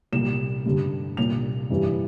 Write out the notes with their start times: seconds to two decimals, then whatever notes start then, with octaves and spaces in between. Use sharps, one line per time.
0.12 C2 A#2 G3 E7
0.66 G2 D3 G3
1.17 C2 A#2 G3 F7
1.70 G2 E3 G3